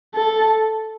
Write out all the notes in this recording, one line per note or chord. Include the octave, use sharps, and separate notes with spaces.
A4